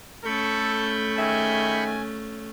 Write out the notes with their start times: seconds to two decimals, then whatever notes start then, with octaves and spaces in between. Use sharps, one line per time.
0.25 A3 C#4 A4 B5 C#6 G6
1.18 D#3 G#4 E5 G#5